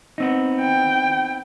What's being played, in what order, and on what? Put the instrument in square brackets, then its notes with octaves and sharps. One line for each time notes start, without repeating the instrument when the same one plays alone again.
[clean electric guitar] B3 C4 D#4
[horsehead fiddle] G5